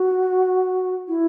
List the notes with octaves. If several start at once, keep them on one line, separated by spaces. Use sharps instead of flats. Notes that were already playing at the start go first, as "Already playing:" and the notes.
Already playing: F#4
E4